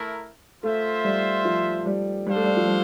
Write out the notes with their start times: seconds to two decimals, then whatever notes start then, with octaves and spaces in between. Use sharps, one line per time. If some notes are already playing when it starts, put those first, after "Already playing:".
Already playing: A3 E4 A#4
0.63 A3 F4 C5 E5
1.04 G3
1.45 F3
1.86 G3
2.26 G3 D4 A4 C5 F5
2.36 A3
2.44 G3
2.57 F3
2.67 G3